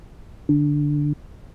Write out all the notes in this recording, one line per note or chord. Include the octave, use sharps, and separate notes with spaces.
D3